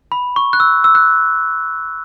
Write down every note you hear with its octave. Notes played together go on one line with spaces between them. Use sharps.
B5
C#6
F#6
E6
E6
F#6